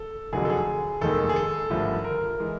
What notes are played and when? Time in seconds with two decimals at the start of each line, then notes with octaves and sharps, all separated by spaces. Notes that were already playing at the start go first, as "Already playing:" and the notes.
Already playing: A4
0.33 F1 F2 D3 F#3 G#4
0.45 A4
0.50 G#4
1.01 F1 D#2 D#3 G#3 A4
1.29 G#4
1.36 A4
1.70 G#1 G2 D3 F3 A3
2.04 A#4
2.40 E3 G#3